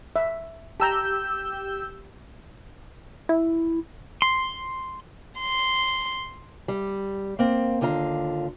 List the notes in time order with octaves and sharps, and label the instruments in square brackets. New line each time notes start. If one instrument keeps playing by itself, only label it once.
[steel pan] E5
[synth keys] G4 E6 G6 [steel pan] A5 A#5
[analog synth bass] E4
[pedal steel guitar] C6
[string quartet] C6
[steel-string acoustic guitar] G3
A#3 C4
D#2 D3 F4 D5 A#5